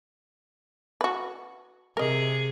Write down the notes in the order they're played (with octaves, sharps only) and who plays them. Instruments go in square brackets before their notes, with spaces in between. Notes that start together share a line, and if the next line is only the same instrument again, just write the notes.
[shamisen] F#4 B4
[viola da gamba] C3 G#4 [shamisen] A#4 D#5